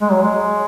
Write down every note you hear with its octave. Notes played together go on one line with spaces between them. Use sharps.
G#3
F#3
G#3